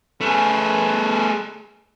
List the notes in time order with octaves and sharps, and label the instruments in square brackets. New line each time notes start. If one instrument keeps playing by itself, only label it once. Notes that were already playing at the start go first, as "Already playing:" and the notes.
[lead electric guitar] A3 G#4 [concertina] C#4 B4 A5